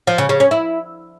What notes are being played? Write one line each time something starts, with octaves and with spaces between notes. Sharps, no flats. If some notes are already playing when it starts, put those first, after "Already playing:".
F3
C#3
C#3
C#4
E4